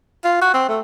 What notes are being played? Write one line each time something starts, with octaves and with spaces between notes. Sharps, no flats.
F4
F#4
C4
A3